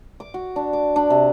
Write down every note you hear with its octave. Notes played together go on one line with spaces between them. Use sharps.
D6
F#4
D4
D6
D4
C3